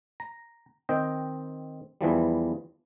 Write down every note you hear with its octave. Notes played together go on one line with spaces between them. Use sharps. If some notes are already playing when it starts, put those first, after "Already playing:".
A#5
D#3 C4 D#5 G5
E2 E3 F3 G3